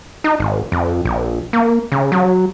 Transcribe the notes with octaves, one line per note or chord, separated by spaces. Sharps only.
D#4
G#1
F2
A#1
A#3
C#3
F#3